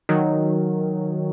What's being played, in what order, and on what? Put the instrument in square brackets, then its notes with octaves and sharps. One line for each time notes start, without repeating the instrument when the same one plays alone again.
[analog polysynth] D#3 F#3